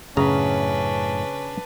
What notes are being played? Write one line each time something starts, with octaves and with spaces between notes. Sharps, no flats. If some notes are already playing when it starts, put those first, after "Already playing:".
F#2 A2 C#3 C#4 D4 B4 A#5